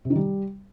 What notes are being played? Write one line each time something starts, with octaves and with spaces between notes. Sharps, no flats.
C3
D#3
G3